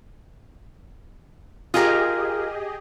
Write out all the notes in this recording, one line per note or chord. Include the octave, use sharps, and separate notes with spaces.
F4 G4 G#4 A#4 D#5